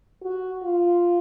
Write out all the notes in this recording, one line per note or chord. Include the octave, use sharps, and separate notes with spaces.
F#4
F4